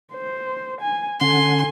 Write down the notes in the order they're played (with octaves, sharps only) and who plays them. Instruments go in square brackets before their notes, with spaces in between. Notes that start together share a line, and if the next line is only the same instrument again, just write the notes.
[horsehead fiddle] C5
G#5
[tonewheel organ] D3 C#4 F#5 [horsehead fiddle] A4 G#5 [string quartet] C6